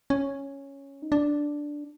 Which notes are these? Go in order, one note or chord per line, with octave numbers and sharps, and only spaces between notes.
C#4
D#4
D4